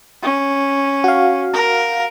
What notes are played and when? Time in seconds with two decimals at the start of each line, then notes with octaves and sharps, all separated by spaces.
0.22 C#4
1.04 F#4 F5
1.53 A#4